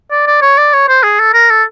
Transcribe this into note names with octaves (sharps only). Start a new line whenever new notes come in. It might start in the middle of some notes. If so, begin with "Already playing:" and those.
D5
D5
C#5
D5
C#5
C5
G#4
A4
A#4
A4